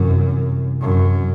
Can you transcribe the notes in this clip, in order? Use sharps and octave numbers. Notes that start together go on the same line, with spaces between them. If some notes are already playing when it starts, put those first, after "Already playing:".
Already playing: F#2 C3 E3 G3
F#2